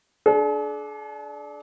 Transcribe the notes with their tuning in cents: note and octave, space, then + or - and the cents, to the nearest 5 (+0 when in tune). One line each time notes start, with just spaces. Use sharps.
D4 +0 G#4 +45